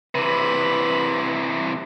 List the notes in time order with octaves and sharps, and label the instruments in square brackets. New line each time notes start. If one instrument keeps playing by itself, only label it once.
[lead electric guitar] C3 E3 [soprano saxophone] B4